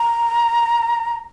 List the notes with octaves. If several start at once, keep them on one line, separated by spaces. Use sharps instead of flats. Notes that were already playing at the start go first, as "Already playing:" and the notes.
Already playing: A#5